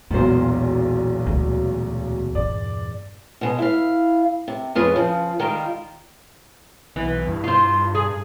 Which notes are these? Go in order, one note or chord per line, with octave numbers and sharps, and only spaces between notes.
E1 B1 E2 A#2 D4 C5
D2
G2 D5
B2 G#3
E4 F5
C3
F2 F4 G#4 B4 C#5
C#3 F3
D#3 G3 G#3 F4 A#4
B1 E3
G2
F4 C5
G#4